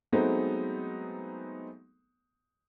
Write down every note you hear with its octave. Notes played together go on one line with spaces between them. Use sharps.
F#3 G#3 A3 B3 C4 D#4